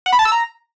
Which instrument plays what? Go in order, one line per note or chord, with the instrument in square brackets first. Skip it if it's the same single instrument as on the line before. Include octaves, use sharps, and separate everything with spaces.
[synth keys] F#5
B5
A5
E6
A#5